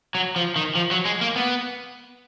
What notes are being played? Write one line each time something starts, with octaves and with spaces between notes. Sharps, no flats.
F#3
F3
D#3
F3
F#3
G#3
A#3
B3